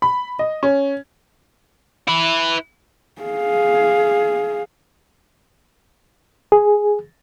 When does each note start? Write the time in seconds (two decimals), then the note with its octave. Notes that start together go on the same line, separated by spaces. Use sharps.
0.02 B5
0.39 D#5
0.63 C#4
2.07 E4 B4
3.22 G#4 F5
6.52 G#4